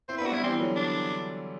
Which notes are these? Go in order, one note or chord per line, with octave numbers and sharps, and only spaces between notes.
C4 E4 C5
B4
B3 D4
F#4
G3 B3 E4
E3 G3 C4
D3 F#3
D4